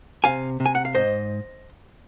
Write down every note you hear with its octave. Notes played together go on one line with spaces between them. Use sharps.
C3 F5 G#5
C3
G#5
F#5
F5
G#2 C5 D#5